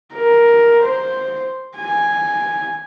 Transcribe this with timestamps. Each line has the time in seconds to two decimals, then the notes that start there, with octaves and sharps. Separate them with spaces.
0.13 A#4
0.83 C5
1.77 G#5